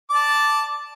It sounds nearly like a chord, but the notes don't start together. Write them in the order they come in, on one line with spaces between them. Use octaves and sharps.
D6 D5 A5